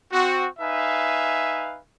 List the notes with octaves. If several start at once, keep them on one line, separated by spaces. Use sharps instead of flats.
C4 F#4
D#4 B4 E5 F5 G#5